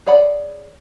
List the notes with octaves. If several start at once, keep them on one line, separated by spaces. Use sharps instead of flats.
G#4 C#5 D5 F#5 B5